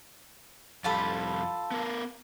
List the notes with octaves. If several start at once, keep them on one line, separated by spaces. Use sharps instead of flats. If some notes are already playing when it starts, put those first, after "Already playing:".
F2 G3 F4 A4 B5
B3 A#4